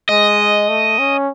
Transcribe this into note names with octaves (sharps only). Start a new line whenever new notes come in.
G#3 D#5
A3
C#4